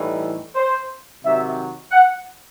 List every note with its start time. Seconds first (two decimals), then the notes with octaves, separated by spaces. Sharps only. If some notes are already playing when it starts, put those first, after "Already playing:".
Already playing: A2 E3 G3 D#4
0.56 C5
1.24 C3 D#3 F#3 E5
1.92 F#5